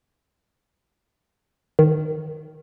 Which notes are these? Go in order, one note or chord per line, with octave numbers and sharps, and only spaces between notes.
D#3